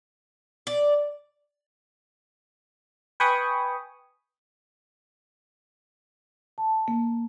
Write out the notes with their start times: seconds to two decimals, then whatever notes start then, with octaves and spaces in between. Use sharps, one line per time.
0.67 D5
3.20 B4 G5 G#5 B5 C#6 D#6
6.58 A5
6.88 A#3